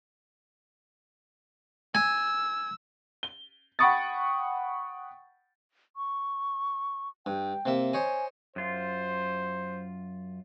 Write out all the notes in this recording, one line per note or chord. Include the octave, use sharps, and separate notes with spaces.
G#5 E6
G7
F#5 G5 B5 C#6 D#6 A6
C#6
G2 G5
C3 A#3 E5
C5 C#5 D#5 G#5
F#2 F4 C5